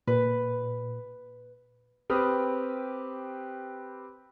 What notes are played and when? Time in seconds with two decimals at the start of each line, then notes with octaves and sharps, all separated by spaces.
0.07 A#2 B4
2.10 C4 G4 B4 D#6 F6